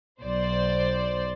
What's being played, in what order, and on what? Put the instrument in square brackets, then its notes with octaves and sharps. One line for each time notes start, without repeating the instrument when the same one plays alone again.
[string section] B1 C5 D5